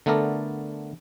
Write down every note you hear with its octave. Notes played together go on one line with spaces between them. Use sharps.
D3 A3 B3 A4 A#4 D5